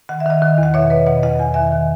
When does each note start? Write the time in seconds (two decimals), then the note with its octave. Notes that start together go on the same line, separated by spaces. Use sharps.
0.09 D#3 F#5
0.20 E5
0.26 D#3 D#5 F#5
0.42 D#3
0.58 E2
0.63 F#5
0.74 B2 C#5 E5
0.90 B2 B4 D#5
1.07 B2 D#5 F#5
1.23 E2 D#5 F#5
1.39 E2 G#5
1.54 D#3 E5 G#5
1.72 D#3